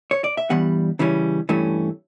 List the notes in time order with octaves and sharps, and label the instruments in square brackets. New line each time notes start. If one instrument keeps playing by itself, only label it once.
[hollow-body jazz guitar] C#5
D5
E5
G2 E3 G3 B3 F#5
C#3 E3 G3 C#4
G2 E3 A3 C#4